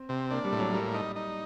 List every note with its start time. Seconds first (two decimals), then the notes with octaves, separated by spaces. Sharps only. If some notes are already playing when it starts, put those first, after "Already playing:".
Already playing: C4
0.09 C3
0.31 A#3 D4
0.44 G3
0.52 A2
0.59 F#3
0.73 G3 A#3
0.94 D#4
1.16 D#4